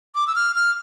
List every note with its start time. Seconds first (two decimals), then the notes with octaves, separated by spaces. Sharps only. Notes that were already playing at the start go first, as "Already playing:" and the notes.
0.15 D6
0.27 E6
0.36 F6
0.56 F6